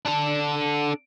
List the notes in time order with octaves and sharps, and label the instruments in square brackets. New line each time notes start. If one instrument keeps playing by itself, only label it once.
[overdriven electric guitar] D4 A4